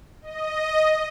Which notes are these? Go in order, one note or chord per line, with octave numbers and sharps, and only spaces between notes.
D#5